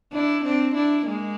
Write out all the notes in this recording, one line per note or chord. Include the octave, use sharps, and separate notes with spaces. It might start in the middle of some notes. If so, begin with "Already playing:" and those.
D4 E4
C4 D4
D4 E4
G#3 A#3